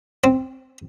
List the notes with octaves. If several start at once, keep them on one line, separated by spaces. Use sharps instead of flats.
C4